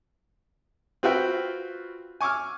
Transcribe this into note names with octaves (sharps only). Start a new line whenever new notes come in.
C4 F4 F#4 B4 E5 G5
G#5 C#6 D6 E6 F6